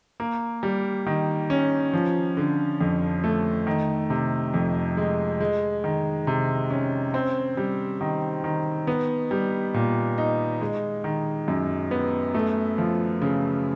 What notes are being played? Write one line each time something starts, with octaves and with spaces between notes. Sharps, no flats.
A#3
G3
D#3
C#4
F3
D3
F2
A3
D#3
C3
F2
G#3
G#3
D#3
C3
C#4
C4
G3
D#3
D#3
B3
G3
A#2
D#4
G#3
D#3
F#2
B3
A3
F3
C#3